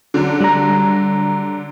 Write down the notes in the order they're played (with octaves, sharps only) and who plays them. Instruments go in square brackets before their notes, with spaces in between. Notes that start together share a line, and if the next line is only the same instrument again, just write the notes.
[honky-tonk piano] D3 F#3
[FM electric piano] G3 A#5